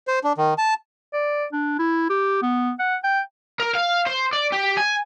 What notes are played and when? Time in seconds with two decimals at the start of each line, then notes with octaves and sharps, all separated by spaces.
0.08 C5
0.24 D4
0.38 D#3
0.58 A5
1.13 D5
1.52 D4
1.79 E4
2.10 G4
2.42 B3
2.79 F#5
3.04 G5
3.60 A#4
3.75 F5
4.06 C5
4.33 D5
4.52 G4
4.77 G#5